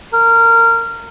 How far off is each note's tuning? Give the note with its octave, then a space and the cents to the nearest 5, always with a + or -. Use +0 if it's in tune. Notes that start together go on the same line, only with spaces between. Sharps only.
A#4 -20